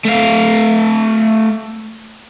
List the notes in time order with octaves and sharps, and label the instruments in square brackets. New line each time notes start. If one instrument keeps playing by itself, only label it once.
[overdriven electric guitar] A3 F5